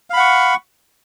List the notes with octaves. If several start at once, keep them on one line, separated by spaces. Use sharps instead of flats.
F5 F#5 B5 C#6